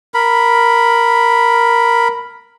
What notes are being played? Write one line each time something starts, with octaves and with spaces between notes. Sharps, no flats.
A#4 B5